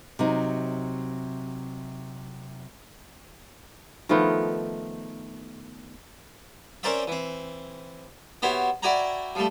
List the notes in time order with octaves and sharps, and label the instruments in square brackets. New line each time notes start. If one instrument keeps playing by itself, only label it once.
[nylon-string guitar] C3 F#3 D#4
[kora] D#3 F3 A3 B3
[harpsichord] C4 C#4 A#4 C5 D5 E5
E3 C4
B3 E4 F#4 G4 C5 C#5
E4 F#4 D5 G5 G#5 A#5
F3 G3 A3